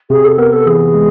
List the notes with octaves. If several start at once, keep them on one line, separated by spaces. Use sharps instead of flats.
C3 G#4
A4
B3 A#4
A4
E3 G#4
G#3